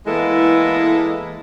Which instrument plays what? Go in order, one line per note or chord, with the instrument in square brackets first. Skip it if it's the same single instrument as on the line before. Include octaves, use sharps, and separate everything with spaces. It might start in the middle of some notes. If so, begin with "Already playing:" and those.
[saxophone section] E3 G#3 A#3 B3 E4 A4